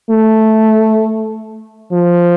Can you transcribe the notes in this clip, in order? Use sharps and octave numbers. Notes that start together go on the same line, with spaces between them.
A3
F3